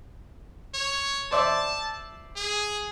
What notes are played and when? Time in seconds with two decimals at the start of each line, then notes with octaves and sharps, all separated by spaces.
0.74 C#5
1.31 C5 D5 E5 A5
2.36 G#4